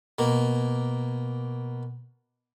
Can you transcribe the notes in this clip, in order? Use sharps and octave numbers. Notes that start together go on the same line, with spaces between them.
B2 A#3